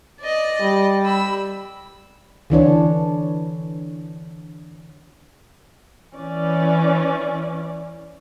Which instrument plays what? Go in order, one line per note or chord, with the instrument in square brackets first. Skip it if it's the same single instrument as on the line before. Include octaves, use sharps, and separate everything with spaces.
[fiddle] D5 D#5
[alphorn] G3
[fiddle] B5 E6
[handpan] D3 E3 D4 C#5
[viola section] E3 C#4 D5